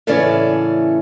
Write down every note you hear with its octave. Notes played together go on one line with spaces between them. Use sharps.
A2 C#3 E3 A3 C#4 D5